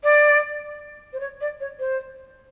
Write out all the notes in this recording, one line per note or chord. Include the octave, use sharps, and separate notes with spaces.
D5
C5
C#5
D5
C#5
C5